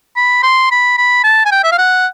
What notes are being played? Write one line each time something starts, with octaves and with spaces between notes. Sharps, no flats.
B5
C6
B5
B5
A5
G#5
G5
E5
F5
F#5